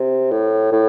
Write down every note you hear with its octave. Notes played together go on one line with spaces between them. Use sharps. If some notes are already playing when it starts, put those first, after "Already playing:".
Already playing: C3
A2
A2